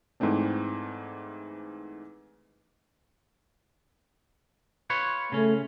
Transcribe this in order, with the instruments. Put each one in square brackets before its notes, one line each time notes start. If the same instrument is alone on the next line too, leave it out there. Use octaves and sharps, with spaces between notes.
[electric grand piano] G#2 E3 A3 C4 D4
[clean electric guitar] F4 B4 C#5
[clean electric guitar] C#3 C#4 [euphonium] A3